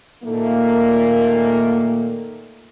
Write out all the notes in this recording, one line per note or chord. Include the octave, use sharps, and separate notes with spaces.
A#2 D#3 A3 A#3